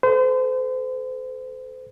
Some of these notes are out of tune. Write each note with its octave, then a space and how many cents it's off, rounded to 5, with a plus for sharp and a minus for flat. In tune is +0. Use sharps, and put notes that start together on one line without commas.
A4 -10 C5 -35